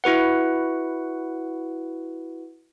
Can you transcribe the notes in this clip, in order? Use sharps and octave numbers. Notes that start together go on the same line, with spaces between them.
E4 F#4 B4 F#5